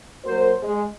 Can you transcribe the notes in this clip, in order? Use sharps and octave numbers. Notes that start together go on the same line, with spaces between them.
F#3 A#3 F#4 A#4 C5
G#3